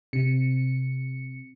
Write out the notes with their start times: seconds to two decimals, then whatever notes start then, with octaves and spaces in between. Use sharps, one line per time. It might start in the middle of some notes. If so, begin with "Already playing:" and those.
0.13 C3 C#7